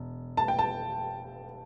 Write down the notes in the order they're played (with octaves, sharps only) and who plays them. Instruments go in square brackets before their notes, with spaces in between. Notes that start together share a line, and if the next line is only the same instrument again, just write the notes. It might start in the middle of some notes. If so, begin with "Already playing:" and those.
Already playing: [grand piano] E1
A5
G5
A5